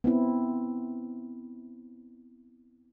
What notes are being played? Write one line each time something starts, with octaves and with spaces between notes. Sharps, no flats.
B3 C4 E4